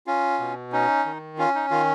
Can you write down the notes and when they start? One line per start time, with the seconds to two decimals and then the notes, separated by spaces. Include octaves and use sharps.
0.07 C#4 F4
0.40 B2
0.72 C#4 D#4
1.06 D#3
1.38 C#4 F4
1.55 D#4
1.71 D#3 F4